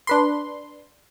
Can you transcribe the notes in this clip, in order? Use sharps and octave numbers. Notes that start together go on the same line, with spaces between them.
D4 B4 C6